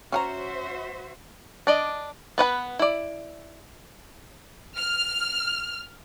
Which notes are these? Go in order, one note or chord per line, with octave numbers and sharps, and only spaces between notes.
C#4 F#4 C5 E5 F#5 A#5
D4 D5 D#5
B3 B4 F#5 B5
E4 D5
F6